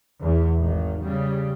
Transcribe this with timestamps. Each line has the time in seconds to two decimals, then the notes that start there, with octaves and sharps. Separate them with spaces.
0.21 E2
0.60 G#1 D#3
1.01 C#3 G3